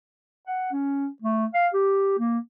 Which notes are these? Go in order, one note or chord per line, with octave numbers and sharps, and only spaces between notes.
F#5
C#4
A3
F5
G4
A#3